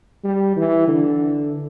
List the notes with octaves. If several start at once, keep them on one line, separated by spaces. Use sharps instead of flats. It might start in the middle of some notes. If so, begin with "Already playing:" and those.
G3
E3
D3